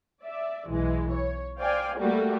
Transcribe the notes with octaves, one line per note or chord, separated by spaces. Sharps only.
D5 E5
B1 E3 G#3
C#5
C5 D5 F5 G5 G#5
G3 A3 A#3 F#4 A4